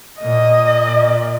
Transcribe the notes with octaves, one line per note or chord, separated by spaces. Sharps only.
A#2 D#5